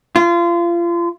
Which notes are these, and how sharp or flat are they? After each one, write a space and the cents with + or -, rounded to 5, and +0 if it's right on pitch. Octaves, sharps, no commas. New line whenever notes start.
F4 -30